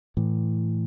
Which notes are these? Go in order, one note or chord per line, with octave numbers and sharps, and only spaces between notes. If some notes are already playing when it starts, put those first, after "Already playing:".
A2 E3